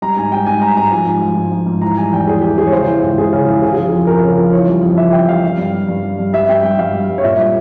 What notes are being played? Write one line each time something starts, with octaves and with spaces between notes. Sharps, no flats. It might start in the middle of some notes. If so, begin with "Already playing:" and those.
G3 A#5
G#2 G#5
G3 G5
G#2 G#5
G3 A#5
G#2 A#5
F3 G#5
G#2
F3
G#2
F3
G#2
E3 A#5
G3 G#5
E2 G5
E2 G#4
E3 G4
G3 G#4
C#5
C#3 C5
E3
C#2
C#2 G#4
C#3
E3
C#3 G#4
G#4
F3
G#4
F2
F2 A#4
C#3
F3
E3 C#5
G3
F2
F2 E5
E3 G5
G3 F5
G3
G2
G3
G2
G3
G2
G3 E5
G2 G5
G3 G5
G2 F5
G3
G2
C#5
A#2 E5
G3